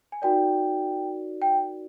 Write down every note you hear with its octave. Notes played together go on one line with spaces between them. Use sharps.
G#5
D#4 F#4 A#4 D5 G5
G5